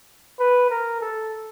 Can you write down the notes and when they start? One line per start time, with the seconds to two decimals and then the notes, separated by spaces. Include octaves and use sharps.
0.40 B4
0.70 A#4
1.01 A4